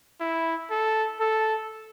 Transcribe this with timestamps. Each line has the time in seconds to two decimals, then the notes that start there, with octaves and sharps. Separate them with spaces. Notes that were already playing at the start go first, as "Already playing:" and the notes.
0.20 E4
0.70 A4
1.20 A4